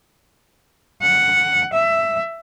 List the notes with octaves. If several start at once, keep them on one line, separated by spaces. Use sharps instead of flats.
F#5
E5